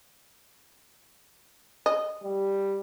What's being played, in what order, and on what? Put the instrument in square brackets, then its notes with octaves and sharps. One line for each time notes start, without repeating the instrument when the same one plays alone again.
[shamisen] D#5
[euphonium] G3